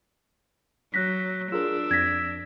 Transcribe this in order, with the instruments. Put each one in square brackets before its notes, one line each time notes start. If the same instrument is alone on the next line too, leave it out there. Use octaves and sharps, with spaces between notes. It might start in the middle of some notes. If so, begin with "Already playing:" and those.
[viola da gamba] F#3 [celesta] F#6 A#6 B6
[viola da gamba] D4 [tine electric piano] F4 G#4 A#4 [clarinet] E6
[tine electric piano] F2 [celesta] G#6 A#6 B6